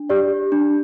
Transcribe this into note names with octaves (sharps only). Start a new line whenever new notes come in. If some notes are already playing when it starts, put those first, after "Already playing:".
Already playing: D4
G4 D5
D4